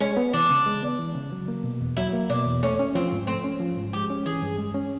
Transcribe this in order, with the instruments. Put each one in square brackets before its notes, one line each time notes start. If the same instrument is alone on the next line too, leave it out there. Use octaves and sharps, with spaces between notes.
[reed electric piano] G#3 [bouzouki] C#4
[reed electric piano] B3
[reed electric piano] E3 [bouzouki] D4
[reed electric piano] C#3
G#3
B3
E3
C#3
F#3
A#3
B2
E2
[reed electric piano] F#3 [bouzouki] E4
[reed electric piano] A#3
[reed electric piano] B2 [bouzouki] D4
[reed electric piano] E2
[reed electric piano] A3 [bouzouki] C#4
[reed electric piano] C#4
[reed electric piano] F3 [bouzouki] C4
[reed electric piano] G#2
[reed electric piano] A3 [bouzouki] C4
[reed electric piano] C#4
F3
G#2
[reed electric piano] G#3 [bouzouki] G4
[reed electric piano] C#4
[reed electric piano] E3 [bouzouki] G#4
[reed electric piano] G2
G#3
C#4